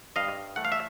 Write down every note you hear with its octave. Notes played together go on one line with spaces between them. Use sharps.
G2 D#5 F5
E3 A3 F#5
F5
E5